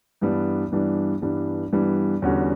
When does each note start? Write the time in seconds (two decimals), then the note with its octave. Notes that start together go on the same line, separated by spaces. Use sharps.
0.21 G2 E3 G3 B3 D4
0.72 G2 E3 G3 B3 D4
1.22 G2 E3 G3 B3 D4
1.73 G2 E3 G3 B3 D4
2.22 E2 D3 G3 C#4 F#4